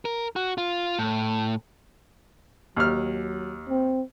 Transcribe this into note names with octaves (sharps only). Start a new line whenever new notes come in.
A#4
F#4
F4
A2
D#2 F#3 F6
C4